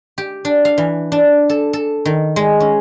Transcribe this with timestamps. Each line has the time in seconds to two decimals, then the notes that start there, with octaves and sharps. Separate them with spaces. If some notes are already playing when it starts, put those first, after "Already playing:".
0.18 G4
0.45 D4
0.65 F5
0.78 E3
1.12 D4
1.49 A4
1.73 A4
2.05 D#3
2.36 G#3
2.60 C#4